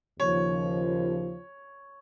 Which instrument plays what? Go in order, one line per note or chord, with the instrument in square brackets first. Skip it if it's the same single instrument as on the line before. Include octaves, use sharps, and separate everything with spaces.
[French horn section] D#2 C#3 F3 [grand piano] C#5